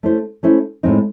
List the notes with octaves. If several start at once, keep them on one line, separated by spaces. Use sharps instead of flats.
A3 C#4 E4 C5
A3 C#4 E4 C5
A2 G#3 C4 D#4